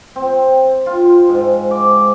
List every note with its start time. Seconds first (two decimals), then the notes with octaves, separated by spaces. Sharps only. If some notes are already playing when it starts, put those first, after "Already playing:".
0.16 C4
0.86 F4
1.29 G#2
1.71 D6